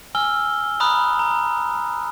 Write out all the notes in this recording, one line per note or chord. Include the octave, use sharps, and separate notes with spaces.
G#5 E6 F6 G7
A#5 B5 D#6 F6 F#6
A#5